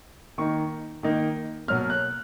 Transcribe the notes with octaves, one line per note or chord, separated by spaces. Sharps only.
D#3 A#3 D#4 C#6
D#3 A#3 D#4
B2 F#3 A#3 F6
F#6